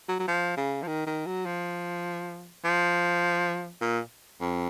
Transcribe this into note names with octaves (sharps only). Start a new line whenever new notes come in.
F#3
F#3
F3
C#3
F3
D#3
D#3
F#3
F3
F3
A#2
F2